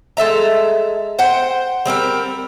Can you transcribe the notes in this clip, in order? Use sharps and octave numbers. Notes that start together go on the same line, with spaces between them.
G#3 A4 E5 A#5
C5 F#5 G5
G3 C4 G4 A#4